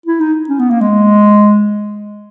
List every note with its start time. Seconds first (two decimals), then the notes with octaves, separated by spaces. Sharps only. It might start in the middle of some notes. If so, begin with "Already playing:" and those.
0.06 E4
0.20 D#4
0.49 C#4
0.59 B3
0.71 A#3
0.81 G#3